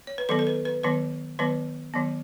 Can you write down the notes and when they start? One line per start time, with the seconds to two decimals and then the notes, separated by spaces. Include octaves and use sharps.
0.07 C#5
0.18 B4
0.29 D#3 F#3 B3 A4
0.39 A4
0.47 B4
0.65 B4
0.84 D#3 F#3 B3 B4
1.39 D#3 F#3 B3 B4
1.94 D#3 F#3 B3